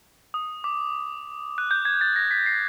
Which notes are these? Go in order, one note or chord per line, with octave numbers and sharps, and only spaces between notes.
D#6
D6
F#6
G6
G#6
A6
A#6
B6
C7